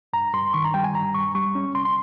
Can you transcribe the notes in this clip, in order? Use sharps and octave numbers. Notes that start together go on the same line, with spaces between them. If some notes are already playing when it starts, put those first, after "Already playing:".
G2 A#5
G2 C6
D#3 C#6
A#5
G3 G5
G#5
G2 A#5
G2 C#6
G3 C#6
C#4
C2 C6
C6